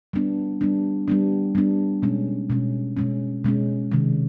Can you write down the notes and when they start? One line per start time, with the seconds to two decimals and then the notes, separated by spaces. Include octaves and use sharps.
0.13 G3 B3 D4
0.61 G3 B3 D4
1.08 G3 B3 D4
1.55 G3 B3 D4
2.02 B2 G#3 C#4
2.50 B2 G#3 C#4
2.97 B2 G#3 C#4
3.44 B2 G#3 C#4
3.92 C3 D#3 G#3